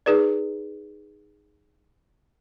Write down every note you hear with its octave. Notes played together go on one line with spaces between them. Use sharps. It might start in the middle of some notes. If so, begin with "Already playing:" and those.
D#4 G#4 B4 D5